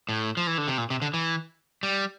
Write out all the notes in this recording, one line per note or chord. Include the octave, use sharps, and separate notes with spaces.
A2
F3
E3
D3
C3
A#2
C3
D3
E3
G3